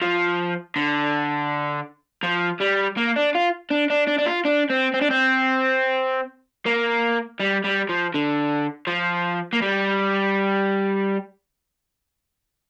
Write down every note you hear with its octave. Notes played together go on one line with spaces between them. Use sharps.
F3
D3
F3
G3
A#3
D4
F4
D4
D4
D4
D4
F4
D4
C4
C4
D4
C4
A#3
G3
G3
F3
D3
F3
A#3
G3